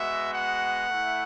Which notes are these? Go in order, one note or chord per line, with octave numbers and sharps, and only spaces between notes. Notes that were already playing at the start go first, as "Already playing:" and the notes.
Already playing: G#3 B3 F#4 E5
F#5
A3 E4